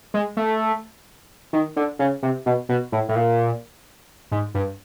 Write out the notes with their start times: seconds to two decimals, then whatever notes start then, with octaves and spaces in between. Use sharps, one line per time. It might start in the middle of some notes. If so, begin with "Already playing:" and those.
0.14 G#3
0.37 A3
1.53 D#3
1.76 D3
1.99 C#3
2.23 C3
2.46 B2
2.69 B2
2.92 A2
3.09 A2
3.16 A#2
4.32 G#2
4.55 G2